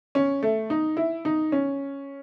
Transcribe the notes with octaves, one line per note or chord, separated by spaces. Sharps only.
C#4
A3
D#4
E4
D#4
C#4